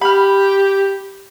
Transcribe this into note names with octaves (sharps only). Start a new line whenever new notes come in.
G4 B5 F6